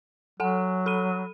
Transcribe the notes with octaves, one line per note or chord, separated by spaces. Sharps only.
F#3 A4 F#5 G#5
A4 B5 D#7